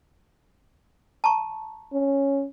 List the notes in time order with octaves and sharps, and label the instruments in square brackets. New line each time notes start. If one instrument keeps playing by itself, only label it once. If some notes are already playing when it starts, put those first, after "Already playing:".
[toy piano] A5 A#5 C#6
[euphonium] C#4